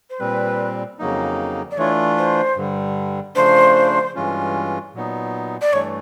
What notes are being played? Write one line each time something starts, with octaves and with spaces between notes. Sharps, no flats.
C5
A#2 G3 C4 B4
F2 C#3 F#3 A#3 D#4
D5
E3 A3 D4 F4 C#5
C5
G2 D3 G3
C#3 F3 A3 D4 C5
G2 E3 G#3 C#4 F4
A#2 F#3 B3 D#4
D5
G2 E3 A3 C#5